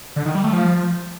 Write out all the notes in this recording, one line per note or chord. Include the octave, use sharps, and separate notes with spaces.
D3
D#3
G3
A3
F3